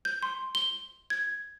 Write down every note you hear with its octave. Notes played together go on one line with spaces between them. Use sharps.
G6
C6
G7
G#6